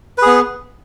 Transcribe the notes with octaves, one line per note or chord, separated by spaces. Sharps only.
B3 G#4 B4